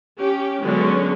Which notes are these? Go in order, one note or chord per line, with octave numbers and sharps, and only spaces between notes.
C#4 G4
D3 F#3 G#3 B3 C#4